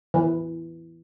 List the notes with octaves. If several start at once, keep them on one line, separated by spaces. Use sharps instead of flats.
E3